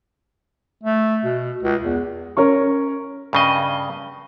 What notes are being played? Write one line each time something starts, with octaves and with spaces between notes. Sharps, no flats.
A3
B2
C#2
E2
C#4 A#4 C#5 C#6
G2 C#3 D#5